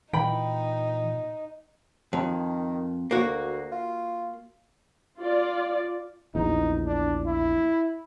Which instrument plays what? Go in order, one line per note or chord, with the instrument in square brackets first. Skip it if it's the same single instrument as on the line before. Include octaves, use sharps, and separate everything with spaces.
[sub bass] A#2 [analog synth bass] E3 [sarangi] D#4 [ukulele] G5 B5
[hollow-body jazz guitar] F2 [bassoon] D#3
[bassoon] D2 [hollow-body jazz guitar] A#3 F#4
[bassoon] F4
[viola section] F4 D5
[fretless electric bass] A#1 E2 [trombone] D#4
[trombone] D4
E4